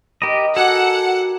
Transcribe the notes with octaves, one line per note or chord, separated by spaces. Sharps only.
D#4 G4 A#4 D#5 B5
F#4 G4 A4 A#4 F#5 G#5